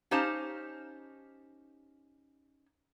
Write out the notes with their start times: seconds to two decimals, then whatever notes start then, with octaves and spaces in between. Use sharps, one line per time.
0.11 C#4 D#4 G4 C5 F5 A5